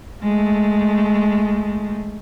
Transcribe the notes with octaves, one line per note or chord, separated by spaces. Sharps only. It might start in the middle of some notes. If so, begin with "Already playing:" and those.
G#3 A3